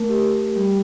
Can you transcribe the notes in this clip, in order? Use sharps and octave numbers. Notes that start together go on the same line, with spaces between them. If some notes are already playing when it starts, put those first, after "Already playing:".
Already playing: A3 A#4
G4
G3